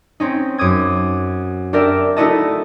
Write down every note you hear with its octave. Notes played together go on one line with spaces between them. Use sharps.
C4 C#4 D#4
F#2 D6 D#6 G#6
D4 G4 A#4 D5 E5
A3 D#4 E4 F#4 D#5 A5